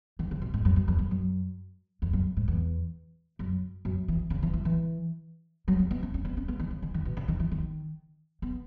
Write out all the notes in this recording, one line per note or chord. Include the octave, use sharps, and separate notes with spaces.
D#3
C#3
B2
G#2
F#2
F#2
E2
F#2
F#2
E2
F#2
G#2
E2
F#2
F#2
E3
C#3
E3
E3
E3
F#3
A#3
B3
C#4
C#4
B3
C#4
B3
D#3
C#3
D#3
D#3
B2
C#3
D#3
E3
D#3
B3